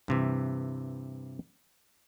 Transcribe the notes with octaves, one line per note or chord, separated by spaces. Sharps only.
G2 C3 E3